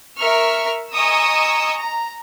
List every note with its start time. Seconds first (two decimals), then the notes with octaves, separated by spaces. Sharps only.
0.17 A#4 E5 C#6 F6
0.92 D#5 G#5 A#5 C#6 D#6 E6
1.77 A#5